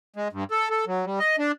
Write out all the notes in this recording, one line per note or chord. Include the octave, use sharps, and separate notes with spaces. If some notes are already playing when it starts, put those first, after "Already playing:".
G#3
G2
A4
A4
F#3
G3
D#5
D4